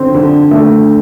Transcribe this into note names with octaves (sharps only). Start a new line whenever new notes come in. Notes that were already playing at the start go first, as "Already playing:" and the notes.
Already playing: D3 C4
D3
A3